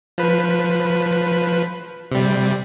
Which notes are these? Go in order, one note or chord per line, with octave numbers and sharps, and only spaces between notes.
F3 B4
C3 G3